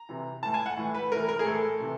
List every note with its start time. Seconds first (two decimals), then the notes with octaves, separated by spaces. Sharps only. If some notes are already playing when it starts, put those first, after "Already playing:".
Already playing: A#5
0.09 C3 E3
0.43 A2 E3 A5
0.54 G#5
0.66 F#5
0.77 A2 E3
0.95 B4
1.11 A2 E3 A#4
1.29 A#4
1.39 G#4
1.46 A2 E3 A4
1.80 C3 E3